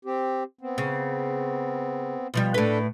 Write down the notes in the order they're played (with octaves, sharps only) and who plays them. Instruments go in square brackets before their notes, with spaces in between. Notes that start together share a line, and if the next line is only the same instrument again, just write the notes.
[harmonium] C4 G4
B3 C4
[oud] C#3
B2 F3 G3
[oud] A2 B4 [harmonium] D4 A4